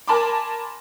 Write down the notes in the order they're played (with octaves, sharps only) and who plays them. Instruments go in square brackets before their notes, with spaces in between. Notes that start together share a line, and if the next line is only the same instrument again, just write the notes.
[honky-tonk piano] A#4 G#5 A5 B5 C6 D6